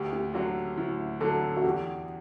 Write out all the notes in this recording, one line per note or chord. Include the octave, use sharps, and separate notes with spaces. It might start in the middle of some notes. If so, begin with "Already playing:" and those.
Already playing: D2 G4
G4
D3 F#3 F#4
D2 E4
D3 F#3 A4
F#4
E2 G4